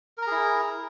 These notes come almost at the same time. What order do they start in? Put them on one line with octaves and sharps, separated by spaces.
A#4 A#5 G#4 E4